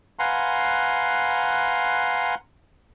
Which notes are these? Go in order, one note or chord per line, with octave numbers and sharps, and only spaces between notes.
B4 F5 F#5 G#5 A#5 C6